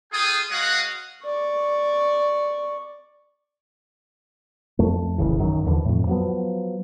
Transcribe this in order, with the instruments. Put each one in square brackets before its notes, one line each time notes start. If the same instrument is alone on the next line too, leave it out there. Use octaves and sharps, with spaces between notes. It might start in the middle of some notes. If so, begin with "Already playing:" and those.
[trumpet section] F4 G#4 A4 G5 D#6
G#3 F#4 C#5 D#5 F5 F#5
[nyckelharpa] D5 C#6
[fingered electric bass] F2 A3
D1 A#1 C#3 E3
F#2 D#3 F#3
D#2 D3 E3 F3
F2 A2
F3 F#3 B3